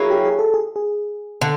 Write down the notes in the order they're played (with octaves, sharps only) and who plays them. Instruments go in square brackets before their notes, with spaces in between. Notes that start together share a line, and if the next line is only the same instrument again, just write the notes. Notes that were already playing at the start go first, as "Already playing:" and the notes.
Already playing: [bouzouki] F#3 A#3 C#4 E4 [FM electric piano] G#4
[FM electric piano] G4
G#4
A4
G#4
G#4
[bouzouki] D3